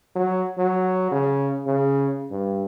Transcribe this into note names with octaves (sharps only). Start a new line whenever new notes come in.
F#3
F#3
C#3
C#3
G2